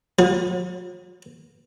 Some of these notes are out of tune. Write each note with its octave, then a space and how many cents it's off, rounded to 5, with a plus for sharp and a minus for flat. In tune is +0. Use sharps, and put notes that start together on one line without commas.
F#3 -45